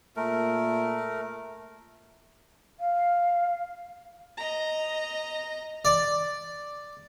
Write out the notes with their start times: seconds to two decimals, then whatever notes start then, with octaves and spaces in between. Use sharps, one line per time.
0.17 A#2 A3 A#4
2.80 F5
4.37 D#5 A#5
5.85 D5